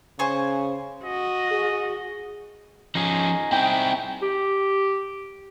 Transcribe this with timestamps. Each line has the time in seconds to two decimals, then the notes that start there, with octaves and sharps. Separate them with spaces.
0.19 C#3 C5 G#5 C#6
1.03 F#4 D#5
1.51 G#4
2.95 F3 C#4 D#4 G#4
3.52 C4 E4 G5
4.22 G4